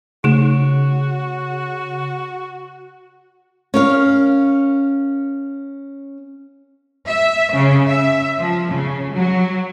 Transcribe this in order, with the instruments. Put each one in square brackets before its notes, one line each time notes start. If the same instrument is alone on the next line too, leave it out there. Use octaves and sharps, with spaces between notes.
[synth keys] C#3 [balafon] A3 D#4 [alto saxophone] F#4
[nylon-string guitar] C#4 A#4 F5
[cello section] E5
C#3
E5
F3
C#3
F#3